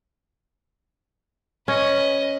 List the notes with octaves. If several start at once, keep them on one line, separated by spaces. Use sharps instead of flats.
C#4 B4 D#5